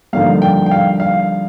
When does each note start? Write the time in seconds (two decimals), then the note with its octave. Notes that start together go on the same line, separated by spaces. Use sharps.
0.13 G2 D3 F3 A#3 D#4 F5
0.42 G5
0.66 G5
0.71 F5
1.00 F5